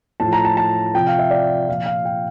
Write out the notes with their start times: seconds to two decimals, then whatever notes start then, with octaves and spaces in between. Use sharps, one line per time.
0.20 A2 F3 A5
0.33 A#5
0.45 A5
0.57 A5
0.94 C3 F3 G5
1.07 F5
1.19 E5
1.31 D5
1.68 A#2 F3 F5
1.86 F5
2.05 G5